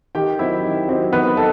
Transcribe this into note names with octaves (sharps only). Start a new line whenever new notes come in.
D#3 G4 G5
F#3 C4 D#4 E4 E5
D#3
F#3 C4 D#4
D#3 B3 B4
D#4 A4